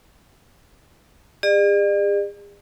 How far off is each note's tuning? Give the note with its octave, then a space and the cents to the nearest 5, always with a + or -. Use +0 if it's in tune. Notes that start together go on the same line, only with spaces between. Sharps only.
G#4 -45 D5 +40